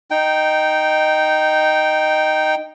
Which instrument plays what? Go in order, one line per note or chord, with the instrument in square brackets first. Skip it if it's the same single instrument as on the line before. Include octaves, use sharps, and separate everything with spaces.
[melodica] D#4 G5